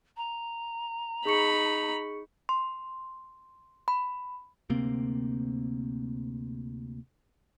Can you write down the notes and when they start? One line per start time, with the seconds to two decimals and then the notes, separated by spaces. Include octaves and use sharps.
0.16 A#5
1.25 D#4 G#4 B5 C#6 C#7
2.49 C6
3.88 B5
4.70 D2 C3 A#3 C4